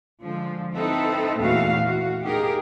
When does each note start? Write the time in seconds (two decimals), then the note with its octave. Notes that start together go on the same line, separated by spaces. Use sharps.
0.22 D3 F3 G#3
0.73 C4 D#4 E4 A4 B4
1.39 E2 A#2 E3 A3 F#4 F5
1.84 F#4
2.24 D#4 G4 G#4 A#4